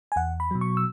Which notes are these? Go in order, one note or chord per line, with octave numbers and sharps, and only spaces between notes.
G#5
E2 F#5
B5
B2 F#3
C#6
E6